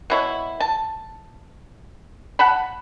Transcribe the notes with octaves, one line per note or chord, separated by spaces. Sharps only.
B2 E4 C#5
A5
F#5 A5 B5